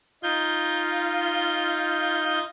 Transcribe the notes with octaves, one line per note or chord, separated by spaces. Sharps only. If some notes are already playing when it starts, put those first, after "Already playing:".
D#4 F4 G6